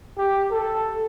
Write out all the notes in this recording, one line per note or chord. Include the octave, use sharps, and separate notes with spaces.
G4
A4